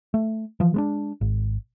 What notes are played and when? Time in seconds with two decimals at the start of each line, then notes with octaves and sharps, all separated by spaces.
0.14 A3
0.60 E3 F3
0.74 G#3 B3 D4
1.21 G#1